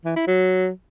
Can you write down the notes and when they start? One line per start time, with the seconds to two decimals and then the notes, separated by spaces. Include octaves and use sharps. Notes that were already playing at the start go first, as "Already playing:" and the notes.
0.05 E3
0.16 E4
0.27 F#3